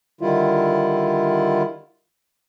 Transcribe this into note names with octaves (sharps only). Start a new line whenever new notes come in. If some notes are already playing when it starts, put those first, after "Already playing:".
D3 D#3 G3 E4 F4